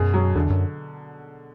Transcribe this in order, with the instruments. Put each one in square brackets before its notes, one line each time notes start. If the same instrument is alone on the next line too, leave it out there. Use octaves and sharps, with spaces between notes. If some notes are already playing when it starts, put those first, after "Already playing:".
Already playing: [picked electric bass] F#2 [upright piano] B2 G#4
[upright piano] F#3
[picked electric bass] E2 [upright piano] D3
[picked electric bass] F#2